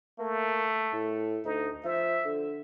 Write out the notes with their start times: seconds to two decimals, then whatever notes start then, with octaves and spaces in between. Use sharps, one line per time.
0.19 A3 A#3
0.92 A2
1.45 D2 D#4
1.85 F3 E5
2.25 D3